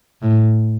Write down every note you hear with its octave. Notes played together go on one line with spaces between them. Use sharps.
A2